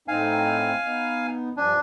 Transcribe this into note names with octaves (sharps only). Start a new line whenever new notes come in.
A2 C4 D#4 F5 G#5
B3 D#4
G2 F3 D4 G#5